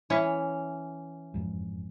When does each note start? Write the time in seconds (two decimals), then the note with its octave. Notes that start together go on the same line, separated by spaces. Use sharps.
0.10 E3 C#4 C#5
1.34 F#1 F2 G#2